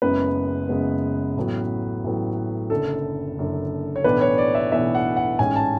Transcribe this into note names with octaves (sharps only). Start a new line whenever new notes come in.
F#1 F#2 C#3 G#3 B3 B4
F#1 F#2 C#3 G#3 B3
A1 A2 F#3 B3
A1 A2 F#3 B3
F#1 F#2 D3 A4
F#1 F#2 D3
C#5
B1 A2 E3 B3 D4 B4
C#5
D5
E5
B1 A2 E3 B3 D4 E5
F#5
F#5
A1 G#2 G#3 C#4 G#5
A5